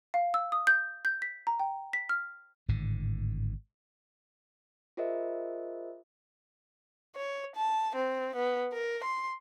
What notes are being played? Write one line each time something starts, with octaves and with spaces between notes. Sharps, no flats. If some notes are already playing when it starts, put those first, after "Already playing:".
F5
E6
D#6
G6
G6
B6
A#5
G5
B6
F6
G#1 A2 D3
F4 G#4 A#4 C5 D#5 E5
C#5
A5
C4
B3
A#4
C6